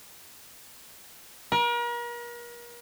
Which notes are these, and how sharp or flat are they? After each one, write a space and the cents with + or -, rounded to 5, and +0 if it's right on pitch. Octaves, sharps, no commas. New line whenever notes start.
A#4 +40